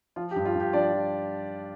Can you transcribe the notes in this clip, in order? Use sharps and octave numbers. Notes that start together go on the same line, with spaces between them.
F3 F4
G4
G2
F4
G2
G4
F3 D4 D5
F3